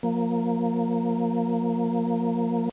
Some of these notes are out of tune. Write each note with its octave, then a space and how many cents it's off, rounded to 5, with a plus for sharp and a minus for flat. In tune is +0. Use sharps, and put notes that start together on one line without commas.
F3 +25 A#3 -5